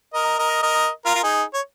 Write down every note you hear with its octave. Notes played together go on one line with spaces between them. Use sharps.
A#4 D#5
A#4 D#5
A#4 D#5
F4 A#4
F4
D#4 G#4
C#5